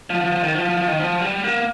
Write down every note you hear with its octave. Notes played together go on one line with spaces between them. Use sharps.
F3
F3
F3
D#3
F3
F3
F3
D#3
F3
G3
A#3